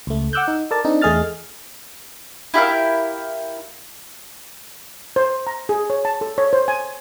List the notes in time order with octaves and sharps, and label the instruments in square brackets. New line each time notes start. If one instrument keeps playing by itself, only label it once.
[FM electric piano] C#2 A3
F#5 D6 E6 F#6 G6
D#4
A4 A#4 D5 A5
C4 D4 D#4
E2 A3 G#4 D#5 F6 A6
[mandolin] E4 G4 A#4 F5
[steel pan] C5
A#5
G#4
C#5
A5
A4
C#5
C5
G#5